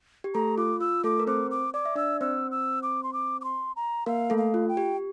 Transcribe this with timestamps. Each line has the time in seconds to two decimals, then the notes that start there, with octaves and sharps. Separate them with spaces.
0.24 G4
0.35 A3 A4 A#5
0.58 F4 D6
0.81 F4 E6
1.04 A3 A4 D6
1.20 A#4
1.27 C4 C5 D6
1.51 D6
1.74 D5 D6
1.85 E5
1.95 D4 D5 E6
2.21 C4 C5 E6
2.51 E6
2.83 D6
3.03 C6
3.13 D6
3.41 D6
3.44 C6
3.76 A#5
4.06 A#3 A#4 F5
4.30 A3 A4
4.38 F5
4.54 F4
4.69 G5
4.77 G4